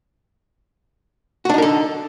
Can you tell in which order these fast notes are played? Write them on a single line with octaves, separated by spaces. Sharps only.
F#4 D4 D#4 A#4 A4